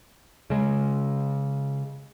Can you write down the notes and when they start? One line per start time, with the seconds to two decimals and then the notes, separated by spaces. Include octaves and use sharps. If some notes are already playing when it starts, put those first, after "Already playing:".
0.50 C#3 G#3